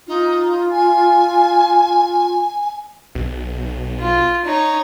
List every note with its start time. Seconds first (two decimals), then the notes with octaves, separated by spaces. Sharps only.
0.07 D#4 F4
0.71 G#5
3.15 B1
4.00 F4
4.45 D#4 C#5